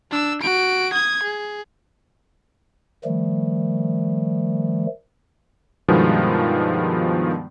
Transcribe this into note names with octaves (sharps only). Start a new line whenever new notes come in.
D4 E6
F#4 D7
D#6 G#6
G#4
D#3 F3 G3 A3
G2 B2 D#3 F3 G#3 B3